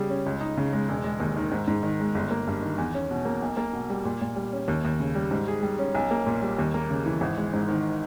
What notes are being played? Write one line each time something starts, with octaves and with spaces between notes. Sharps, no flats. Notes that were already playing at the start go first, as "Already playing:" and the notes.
Already playing: C#3 G3 G#4
C#4
C#2
D#4
C#3
G#3
E1
G#3
D#2
D#3
G#2
G#2
D#3
G#3
G1
A#3
G2
D#3
E2
C#4
B2
A#3
B1
A#3
B2
G3
A#2
A#2
G3
C#4
D#2
D#2
C#3
G3
G#2
G#4
G3
C#4
B1
A#3
A#2
G3
D#2
A#3
C#3
E3
G#1
G#3
G#2
D#3